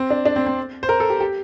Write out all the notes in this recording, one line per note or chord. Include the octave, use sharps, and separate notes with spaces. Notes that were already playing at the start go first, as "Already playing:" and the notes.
Already playing: C4
D4
D4
C4
C4
C5
A#4
A4
G4
G4